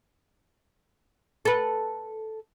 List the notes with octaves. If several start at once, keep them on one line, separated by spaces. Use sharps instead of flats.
A4 B4